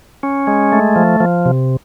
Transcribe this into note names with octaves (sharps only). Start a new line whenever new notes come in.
C#4
G#3
A3
F3
F3
C3